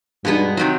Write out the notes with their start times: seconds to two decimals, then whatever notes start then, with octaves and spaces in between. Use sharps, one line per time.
0.25 G2 B2 G#3 B3 D#4
0.57 C3 D#3 F#3